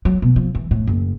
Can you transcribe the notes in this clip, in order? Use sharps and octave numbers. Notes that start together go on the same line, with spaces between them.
F#3
B2
F3
E3
A2
F#1